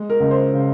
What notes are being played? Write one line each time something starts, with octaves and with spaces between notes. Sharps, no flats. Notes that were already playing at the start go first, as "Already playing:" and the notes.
Already playing: G#3
A#4
C#2
C5
C#3